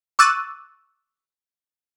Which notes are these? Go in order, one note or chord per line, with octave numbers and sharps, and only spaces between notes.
C#6 D6 E6 F#6 A6 D#7